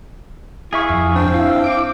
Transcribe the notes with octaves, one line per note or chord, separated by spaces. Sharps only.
E4 G#4 E5 F5 C#6
F2
C4 D4
E4 F5
D6